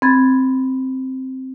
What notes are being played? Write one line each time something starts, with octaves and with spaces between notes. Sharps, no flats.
C4 B5 G#6 A6